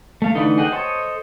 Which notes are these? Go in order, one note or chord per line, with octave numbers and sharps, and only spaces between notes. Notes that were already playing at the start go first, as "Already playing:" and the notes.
A3 F5
D3 E3 A3 B3 D#4
G#4 D#5 F#5 G5
A4 C5 C#5 D#5